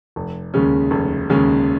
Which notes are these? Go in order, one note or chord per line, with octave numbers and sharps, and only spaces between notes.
F1
D#2 C#3 G#3 C#4
F1
D#2 C#3 G#3 C#4